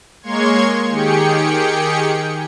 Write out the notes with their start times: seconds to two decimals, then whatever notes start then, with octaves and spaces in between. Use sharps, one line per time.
0.22 G#3 A#3 C#5 C6 C#6 G#6
0.89 D#3 G4 G#4 G5 C#7